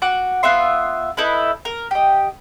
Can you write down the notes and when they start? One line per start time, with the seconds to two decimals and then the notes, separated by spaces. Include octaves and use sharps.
0.02 F#4 F#5 D6
0.43 B3 F4 E5 C6
1.17 D#4 E4 A4 B4
1.65 A#4
1.91 G4 D#5